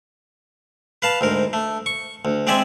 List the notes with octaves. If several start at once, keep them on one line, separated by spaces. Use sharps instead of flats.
B4 F5 A5
D2 G#2 A#4
A3
C#6
D2
G#3 C4 D5 E5 G#5